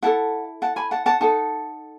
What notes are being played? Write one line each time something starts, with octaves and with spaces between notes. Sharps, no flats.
E4 A4 F#5 A5
F#5 A5
G#5 B5
F#5 A5
F#5 A5
D#4 A4 F#5 A5